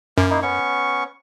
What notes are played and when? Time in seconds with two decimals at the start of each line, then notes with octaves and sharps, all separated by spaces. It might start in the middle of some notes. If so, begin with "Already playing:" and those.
0.18 F#2 A#3 A#4
0.30 A#3 D#4 E4
0.42 B3 C#4 C#6